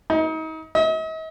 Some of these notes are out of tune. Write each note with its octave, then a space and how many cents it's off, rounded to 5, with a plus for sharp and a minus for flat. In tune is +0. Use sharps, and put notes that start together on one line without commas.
D#4 +35
D#5 +45